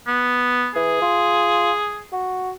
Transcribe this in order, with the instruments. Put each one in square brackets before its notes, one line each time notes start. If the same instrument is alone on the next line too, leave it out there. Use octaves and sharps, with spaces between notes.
[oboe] B3
[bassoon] E3 [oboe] G#4
[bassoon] F4
F#4